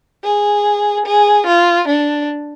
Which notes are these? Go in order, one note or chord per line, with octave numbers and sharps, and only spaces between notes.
G#4
G#4
F4
D4